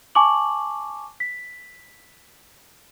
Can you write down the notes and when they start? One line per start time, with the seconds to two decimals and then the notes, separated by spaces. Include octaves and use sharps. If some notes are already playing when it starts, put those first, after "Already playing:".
0.15 G#5 A5 C#6 D6 F#7
1.20 B6